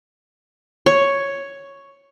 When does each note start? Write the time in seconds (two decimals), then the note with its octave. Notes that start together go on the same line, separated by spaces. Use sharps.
0.86 C#5